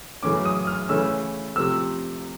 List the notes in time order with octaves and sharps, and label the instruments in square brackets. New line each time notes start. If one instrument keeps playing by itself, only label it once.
[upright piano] F#2 C#3 E3 A3 C#4 D6
D#6
F6
C#3 E3 A3 C#4 E4 E6
C3 F3 A3 E6